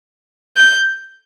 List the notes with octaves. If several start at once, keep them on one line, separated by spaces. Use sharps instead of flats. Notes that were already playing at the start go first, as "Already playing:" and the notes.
G6